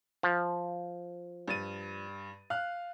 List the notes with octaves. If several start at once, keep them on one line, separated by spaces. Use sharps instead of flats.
F3
G2 A6 D#7
F5 F6 F#6